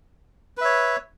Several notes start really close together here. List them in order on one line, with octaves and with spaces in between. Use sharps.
B4 E5 C#5